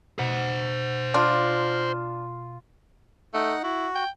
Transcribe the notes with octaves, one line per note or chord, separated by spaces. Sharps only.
B2 C5 F#5
D4 F4
A3 D#4 F#5
E4 F#4
G5